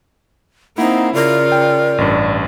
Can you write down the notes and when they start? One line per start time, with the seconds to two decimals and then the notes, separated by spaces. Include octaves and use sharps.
0.78 A#3 C4 D#4 E4 F#5
1.15 C#3 F4 A#4 D5
1.52 G5
1.98 A1 G2